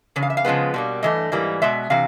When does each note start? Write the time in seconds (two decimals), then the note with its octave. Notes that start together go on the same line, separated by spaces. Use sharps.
0.16 E2 C#3
0.23 F5
0.30 E5
0.37 F5
0.45 C#3 F3 G#3 B3
0.74 B2 G3 A#3
1.03 G2 E3 A3 D#5
1.32 G#2 E3 G3 A#3
1.62 B2 G#3 E5
1.90 C3 E3 F5